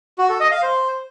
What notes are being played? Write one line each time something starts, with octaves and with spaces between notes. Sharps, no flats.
F#4
A4
D#5
F5
C5